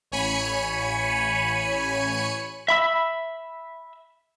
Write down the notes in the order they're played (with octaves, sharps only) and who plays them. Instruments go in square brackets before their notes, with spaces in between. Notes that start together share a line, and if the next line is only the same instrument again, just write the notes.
[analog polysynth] A1 C#5 G#5 B5 C#7 D#7
[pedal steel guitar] E5 B5 E6